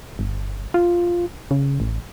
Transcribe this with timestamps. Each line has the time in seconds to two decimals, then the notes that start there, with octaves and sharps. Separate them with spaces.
0.19 G1
0.74 F4
1.51 C#3
1.80 A1